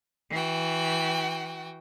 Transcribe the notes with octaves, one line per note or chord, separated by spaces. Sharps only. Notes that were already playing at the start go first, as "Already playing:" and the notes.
E3 F#4 G5